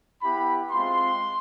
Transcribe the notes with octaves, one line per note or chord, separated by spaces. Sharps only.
B3 E4 G4 B5
G#3 C4 F4 C6